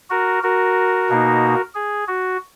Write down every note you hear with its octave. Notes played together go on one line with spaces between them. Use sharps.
F#4 A#4
F#4 A#4
B2 A#3 D#4
G#4
F#4